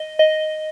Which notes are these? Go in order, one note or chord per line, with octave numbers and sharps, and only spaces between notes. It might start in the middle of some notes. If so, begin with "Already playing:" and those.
Already playing: D#5
D#5